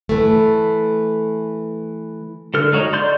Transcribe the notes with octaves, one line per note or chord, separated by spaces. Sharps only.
E3 A3
D3 A4 F6
G#3 D#4 F#4 C#5
D5 C6 G6